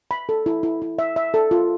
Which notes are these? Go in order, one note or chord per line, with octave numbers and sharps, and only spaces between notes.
B5
A4
E4
E4
E4
E5
E5
A4
F4